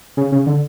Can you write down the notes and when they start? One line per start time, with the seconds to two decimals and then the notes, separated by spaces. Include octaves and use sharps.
0.17 C#3
0.32 C#3
0.47 D3